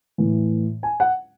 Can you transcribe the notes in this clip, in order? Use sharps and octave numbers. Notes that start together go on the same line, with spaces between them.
A2 E3
G#5
F#5